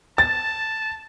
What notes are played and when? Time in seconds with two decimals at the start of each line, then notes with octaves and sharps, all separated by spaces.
0.18 A5 A6